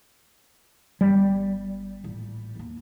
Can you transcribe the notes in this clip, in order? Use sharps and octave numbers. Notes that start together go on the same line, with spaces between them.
G1 G3
A1 A#2
D#2 A#3